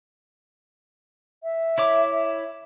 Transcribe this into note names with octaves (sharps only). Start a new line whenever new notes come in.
E5
E4 C#5 D6